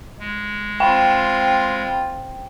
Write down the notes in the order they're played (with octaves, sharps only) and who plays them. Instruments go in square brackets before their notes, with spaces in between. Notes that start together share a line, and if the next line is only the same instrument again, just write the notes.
[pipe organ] G#3
[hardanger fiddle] C4 F4 [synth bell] G5 [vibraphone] B5